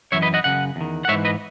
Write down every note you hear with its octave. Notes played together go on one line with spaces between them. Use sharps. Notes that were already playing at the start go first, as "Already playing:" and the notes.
F#2 E3 C#5 E5
B4 D#5
D#5 F#5
F#2 C#3 F#5
E2 D#3
F#5
G#2 E3 C#5 E5
B4 D#5